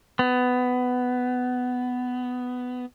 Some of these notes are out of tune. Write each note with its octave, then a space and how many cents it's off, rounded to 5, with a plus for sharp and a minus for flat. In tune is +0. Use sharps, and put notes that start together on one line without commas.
B3 +15